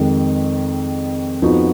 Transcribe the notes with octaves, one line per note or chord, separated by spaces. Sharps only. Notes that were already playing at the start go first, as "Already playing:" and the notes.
Already playing: F2 D#3 G#3
F2 F3 B3 D#4 F#4